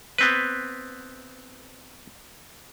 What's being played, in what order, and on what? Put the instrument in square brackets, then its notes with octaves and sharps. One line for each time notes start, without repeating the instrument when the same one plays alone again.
[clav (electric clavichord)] B3 C4 B4